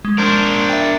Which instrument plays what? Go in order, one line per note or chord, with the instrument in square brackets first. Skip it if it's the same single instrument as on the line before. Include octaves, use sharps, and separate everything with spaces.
[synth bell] G#3
[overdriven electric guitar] D4 A#4 [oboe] C5
[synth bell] E5 G5